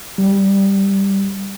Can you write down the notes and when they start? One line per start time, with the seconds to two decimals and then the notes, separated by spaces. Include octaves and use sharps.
0.18 G3